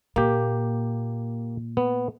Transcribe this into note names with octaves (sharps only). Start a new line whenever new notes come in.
A#2 A#3 G4
B3